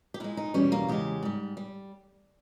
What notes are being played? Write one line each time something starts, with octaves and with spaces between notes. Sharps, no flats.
G4
A#2 G#3 E4
D#4
E2 B2 G3 C#4
A#3
E2 C#3 G#3 G4
G#2 G3
G3